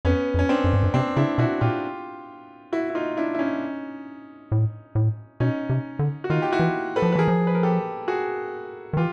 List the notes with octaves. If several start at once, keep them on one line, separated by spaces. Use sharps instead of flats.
F2 B3 C#4
F2
C#4
C4 D4
F#2
G2
F#2
C3 C4 D4
C#3 D4 E4
B2 E4 F#4
A#2 F4 G4
E4 F#4
E4
D#4 F4
D4 E4
E4
C#4 D#4
A2
A2
B2 C#4 D#4
C3
D3
F#4
D#3 D#4 F4
G4
E4 F#4
E3
A4 B4
F3
B4
E3 G#4 A#4
F3
B4
A#4
G4 A4
F#4 G#4
D#3
E3 F4 G4